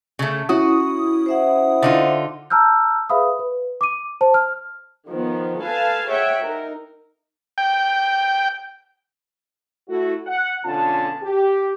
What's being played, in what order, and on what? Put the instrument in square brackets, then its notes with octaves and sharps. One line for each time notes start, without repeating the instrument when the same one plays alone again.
[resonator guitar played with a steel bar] C#3 A3
[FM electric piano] C#4 E4 D#6 [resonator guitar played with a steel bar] F#4
[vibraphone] C5 E5 F#5
[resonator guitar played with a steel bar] D3 D#4 F4
[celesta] A5 A#5 E6 F6 G6
G#4 B4 E5 F5 B5 D#6
B4
D6 D#7
C5 A5
F6
[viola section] D#3 F3 B3
A4 B4 F5 G#5 A5
G#4 C#5 E5 F#5 G5
D#4 A#4
[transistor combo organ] G5
[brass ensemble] A3 E4 F#4
F#5
B1 D3 C#4 F4 A5
G4